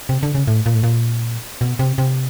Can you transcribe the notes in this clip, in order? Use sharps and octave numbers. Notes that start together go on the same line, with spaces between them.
C3
D3
C#3
A2
A#2
A2
A#2
B2
C3
C3